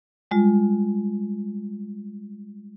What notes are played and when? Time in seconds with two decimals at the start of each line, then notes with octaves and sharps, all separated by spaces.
0.31 G3 G#3 F4